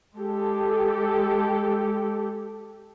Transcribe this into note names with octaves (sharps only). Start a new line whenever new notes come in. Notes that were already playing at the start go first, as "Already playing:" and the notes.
G#3 G4 A4